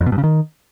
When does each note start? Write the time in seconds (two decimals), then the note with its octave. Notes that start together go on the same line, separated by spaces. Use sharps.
0.01 F2
0.06 B2
0.12 G2
0.18 C#3
0.24 D#3